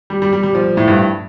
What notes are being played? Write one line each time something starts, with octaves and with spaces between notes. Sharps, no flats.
G3
G3
G3
G3
F3
A2
G2